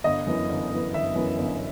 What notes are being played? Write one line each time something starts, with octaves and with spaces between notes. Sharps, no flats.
G1 D#5
F#2 E3 B3
G1
F#2 E3 B3
G1 E5
F#2 E3 B3
G1